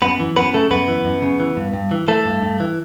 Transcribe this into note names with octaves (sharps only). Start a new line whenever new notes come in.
F#2 B3 B4
E3
F#2 B3 B4
C#3 A3 A4
F#2 B3 B4
E3
F#2
C#3
E3
G2
G2
E3
E3 A3 A4
G2
G2
E3